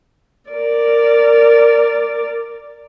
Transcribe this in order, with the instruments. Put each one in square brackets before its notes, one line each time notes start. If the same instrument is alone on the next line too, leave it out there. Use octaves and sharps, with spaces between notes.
[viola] A#4 D5